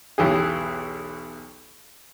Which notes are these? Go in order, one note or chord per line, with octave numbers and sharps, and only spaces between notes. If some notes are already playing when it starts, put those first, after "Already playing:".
B1 E2 E3 G4 G#4